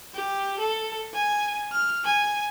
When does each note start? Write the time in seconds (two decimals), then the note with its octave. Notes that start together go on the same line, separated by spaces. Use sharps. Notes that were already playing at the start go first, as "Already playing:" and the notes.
0.14 G4
0.59 A4
1.14 G#5
1.72 F6
2.05 G#5